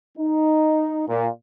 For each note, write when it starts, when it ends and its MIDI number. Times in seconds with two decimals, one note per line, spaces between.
0.17 1.02 63
1.08 1.28 46